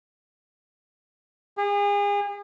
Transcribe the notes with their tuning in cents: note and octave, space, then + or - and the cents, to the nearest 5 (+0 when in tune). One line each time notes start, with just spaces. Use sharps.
G#4 -35